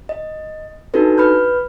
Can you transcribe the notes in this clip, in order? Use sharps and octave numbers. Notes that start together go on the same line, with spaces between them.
D#5
D4 D#4 F#4 A4 B4
B4 B5 F6 G6